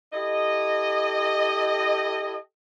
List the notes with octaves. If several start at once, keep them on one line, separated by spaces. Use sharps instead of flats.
E4 G4 A4 D#5